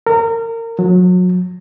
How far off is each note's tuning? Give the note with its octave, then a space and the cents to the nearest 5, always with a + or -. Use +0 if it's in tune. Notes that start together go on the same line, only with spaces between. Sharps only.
A#4 -25
F#3 -30